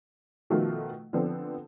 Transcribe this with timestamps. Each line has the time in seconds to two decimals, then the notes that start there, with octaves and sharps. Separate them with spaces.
0.50 B2 D#3 F3 A3 F4
1.13 D3 F3 B3 C4 D4 A4